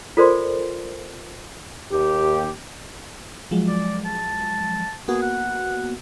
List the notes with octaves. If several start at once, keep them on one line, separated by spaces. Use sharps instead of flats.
F4 A4 A#4 C5 D5 C6
D#2 G4
F3 F#3 G#3
D5
A5
A#3 B3 F#4 G#4
F#5